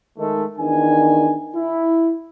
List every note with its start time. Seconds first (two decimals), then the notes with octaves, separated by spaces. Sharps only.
0.18 D#3 G#3 A3
0.58 E2 D#3 D4 G#5
1.54 E4